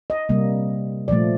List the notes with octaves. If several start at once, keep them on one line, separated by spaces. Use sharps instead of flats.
D#5
C3 G3 A#3
A#2 F3 A3 D5